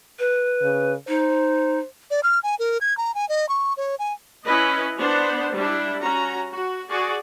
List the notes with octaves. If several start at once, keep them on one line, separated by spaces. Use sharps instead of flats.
B4
C#3
D#4 C5
D5
F6
G#5
A#4
G#6
A#5
G#5
D#5
C#6
C#5
G#5
C#4 E4 B4 D#5
B3 D4 C5
G3 D4 E4
C#4 F#4 A#5
F#4
F#4 G#4 D5